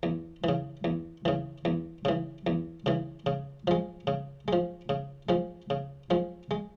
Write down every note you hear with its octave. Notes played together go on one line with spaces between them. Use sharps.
E2
C#3 E3
E2
C#3 E3
E2
C#3 E3
E2
C#3 E3
C#3
F3 G#3
C#3
F3 G#3
C#3
F3 G#3
C#3
F3 G#3
G#3